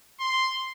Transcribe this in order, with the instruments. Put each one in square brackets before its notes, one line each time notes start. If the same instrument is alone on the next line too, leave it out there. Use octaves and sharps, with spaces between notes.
[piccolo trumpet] C6